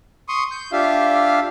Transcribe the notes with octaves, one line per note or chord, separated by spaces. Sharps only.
C6 C#6 D#6
G6
D4 F4 G4 E5 F5